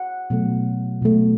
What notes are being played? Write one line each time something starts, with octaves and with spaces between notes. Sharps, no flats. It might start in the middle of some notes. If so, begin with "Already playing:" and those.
Already playing: F#5
B2 F#3 A3
B2 F#3 A3